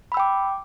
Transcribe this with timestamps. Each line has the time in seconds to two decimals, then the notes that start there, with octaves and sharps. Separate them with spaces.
0.12 B5
0.14 E6
0.17 G5
0.20 D6